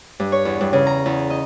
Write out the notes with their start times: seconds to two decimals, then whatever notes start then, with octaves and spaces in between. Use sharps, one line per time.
0.20 G2
0.32 C#5
0.45 E2
0.61 G2
0.73 C#3
0.87 A#5
1.06 E2
1.30 D#5